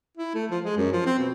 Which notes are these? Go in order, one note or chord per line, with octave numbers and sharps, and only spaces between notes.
E4
A3
F3
G#3
F#2
F3
C4
B2